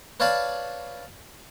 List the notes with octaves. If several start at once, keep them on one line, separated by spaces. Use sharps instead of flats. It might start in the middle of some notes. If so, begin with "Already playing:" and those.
B4 C#5 D5 F5 A5 B5